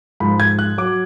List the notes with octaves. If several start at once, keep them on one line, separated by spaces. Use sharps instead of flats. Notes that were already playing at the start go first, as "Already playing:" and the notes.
G#2 F3 B5
G#6
F#6
F#3 D6